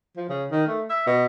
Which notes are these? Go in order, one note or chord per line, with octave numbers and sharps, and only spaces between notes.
F3
C#3
D#3
A3
E5
B2